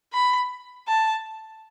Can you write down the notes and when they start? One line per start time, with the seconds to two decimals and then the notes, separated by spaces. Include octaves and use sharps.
0.14 B5
0.88 A5